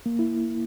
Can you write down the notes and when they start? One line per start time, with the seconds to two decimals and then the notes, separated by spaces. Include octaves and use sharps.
0.06 A#3
0.19 E4